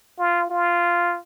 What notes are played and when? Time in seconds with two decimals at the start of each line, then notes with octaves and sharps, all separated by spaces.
0.19 F4
0.50 F4